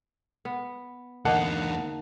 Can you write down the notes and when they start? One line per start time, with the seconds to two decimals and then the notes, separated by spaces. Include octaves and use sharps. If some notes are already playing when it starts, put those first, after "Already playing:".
0.45 B3
1.25 E2 D3 A#3 D#4 F#5 A5